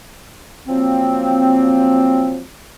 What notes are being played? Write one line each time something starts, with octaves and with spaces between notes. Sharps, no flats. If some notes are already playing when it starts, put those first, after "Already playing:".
F3 F#3 A#3 C4